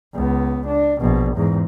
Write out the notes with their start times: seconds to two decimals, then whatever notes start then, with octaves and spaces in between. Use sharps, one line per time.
0.15 C#2 B3
0.67 D4
1.00 A#1 B2
1.36 E2 G#2